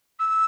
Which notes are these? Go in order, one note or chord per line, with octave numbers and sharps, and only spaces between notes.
E6